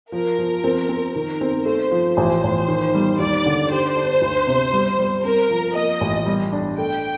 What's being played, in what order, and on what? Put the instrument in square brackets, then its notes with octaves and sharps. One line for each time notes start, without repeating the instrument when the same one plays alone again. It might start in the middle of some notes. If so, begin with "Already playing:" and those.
[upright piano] F3 [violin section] A#4
[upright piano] F3
C4
C4
[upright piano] D#3 [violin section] A#4
[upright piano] C4
[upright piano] A3 [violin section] C5
[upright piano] F3
[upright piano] A1 [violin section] C5
[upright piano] A1
D#3
G3
[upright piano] D#2 [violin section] D5
[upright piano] D3
[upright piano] G4 [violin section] C5
[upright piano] D4
D2
C3
G3
G3
[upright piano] C4 [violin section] A#4
[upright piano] F3
[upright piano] A#3 [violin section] D#5
[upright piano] A1
G3
D4
[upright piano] A3 [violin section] G5